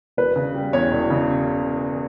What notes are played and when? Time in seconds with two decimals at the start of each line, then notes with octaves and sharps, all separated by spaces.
0.17 E1 B4
0.36 C#3
0.54 G3
0.73 E2 C#5
0.91 E1
1.10 C#3